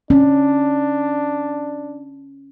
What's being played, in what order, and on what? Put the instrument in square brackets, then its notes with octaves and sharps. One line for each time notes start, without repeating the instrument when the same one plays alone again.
[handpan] C#4 [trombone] D4